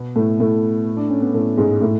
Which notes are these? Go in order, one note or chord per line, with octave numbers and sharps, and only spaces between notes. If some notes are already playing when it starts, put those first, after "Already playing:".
Already playing: B2 B3
A2 A3
A2 A3
D4
C#4
B3
A2 A3
G#2 G#3
A2 A3